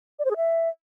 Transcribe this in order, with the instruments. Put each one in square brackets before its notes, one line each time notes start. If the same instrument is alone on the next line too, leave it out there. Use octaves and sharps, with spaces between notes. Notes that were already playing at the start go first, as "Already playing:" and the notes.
[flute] D5
C5
G#4
E5